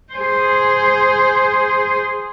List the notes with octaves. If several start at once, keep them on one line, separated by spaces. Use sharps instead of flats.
G#4 C5